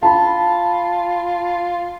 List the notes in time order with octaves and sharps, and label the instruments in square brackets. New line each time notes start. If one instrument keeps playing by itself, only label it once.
[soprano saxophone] F4 [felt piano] A5 B5